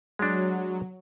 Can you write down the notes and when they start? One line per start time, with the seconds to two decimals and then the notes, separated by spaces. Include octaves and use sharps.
0.19 F#3 G#3 D4